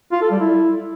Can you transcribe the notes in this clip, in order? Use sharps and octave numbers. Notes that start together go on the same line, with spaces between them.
F4
A4
G3
E4